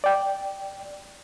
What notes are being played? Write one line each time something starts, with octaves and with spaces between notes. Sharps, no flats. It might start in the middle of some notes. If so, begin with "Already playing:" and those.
D5 G5